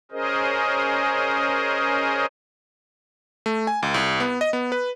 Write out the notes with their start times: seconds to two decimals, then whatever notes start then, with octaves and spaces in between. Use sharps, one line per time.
0.12 C#4 G#4 A#4 C5 D#5
3.46 A3
3.67 G#5
3.83 C#2
3.94 C2
4.20 B3
4.41 D#5
4.53 B3
4.72 B4